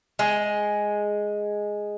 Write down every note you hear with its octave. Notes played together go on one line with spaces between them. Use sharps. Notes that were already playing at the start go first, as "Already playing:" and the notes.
G#3